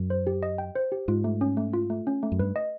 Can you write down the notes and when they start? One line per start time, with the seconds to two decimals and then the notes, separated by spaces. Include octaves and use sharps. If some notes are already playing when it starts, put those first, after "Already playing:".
Already playing: F#2
0.10 C5
0.27 G4
0.43 D#5
0.58 G5
0.75 C5
0.92 G4
1.08 G#2 F4
1.24 A3
1.41 C#4
1.57 A3
1.73 F4
1.90 A3
2.07 C#4
2.23 A3
2.32 F#2
2.39 G2 B4
2.56 D#5